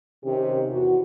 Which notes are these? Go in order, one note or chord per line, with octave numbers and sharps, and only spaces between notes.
C3 D#3 C4 C#4 G4
E2 F#4